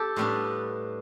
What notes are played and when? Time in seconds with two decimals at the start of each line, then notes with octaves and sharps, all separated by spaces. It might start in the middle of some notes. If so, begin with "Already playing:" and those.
Already playing: G4 A4
0.16 A2 G3 B3 D4